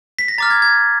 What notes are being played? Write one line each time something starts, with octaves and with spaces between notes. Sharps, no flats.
B6
A#6
A#5 D6 F6 A6
G#6
G#6